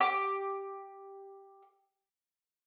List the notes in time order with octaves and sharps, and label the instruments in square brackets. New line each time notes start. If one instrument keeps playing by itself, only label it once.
[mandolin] G4 D6